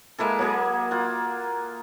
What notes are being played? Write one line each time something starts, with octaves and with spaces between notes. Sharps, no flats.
G#3 A#3 E4 A4
F#3 A#3 G#4
F4 F#5